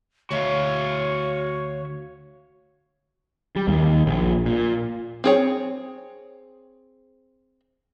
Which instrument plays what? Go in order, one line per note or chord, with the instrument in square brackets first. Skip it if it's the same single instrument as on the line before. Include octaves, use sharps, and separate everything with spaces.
[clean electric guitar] D2 [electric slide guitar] F#4 E5 F5 [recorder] C#5
[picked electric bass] G3
D#2
A#1
A#2
[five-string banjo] C4 G#4 C#5